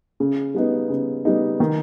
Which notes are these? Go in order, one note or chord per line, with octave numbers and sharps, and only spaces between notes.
C#3
G3 B3 D#4
C#3
G3 B3 D#4
D#3